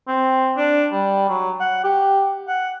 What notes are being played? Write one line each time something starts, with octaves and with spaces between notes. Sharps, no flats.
C4
D4
G3
F#3
F#5
G4
F#5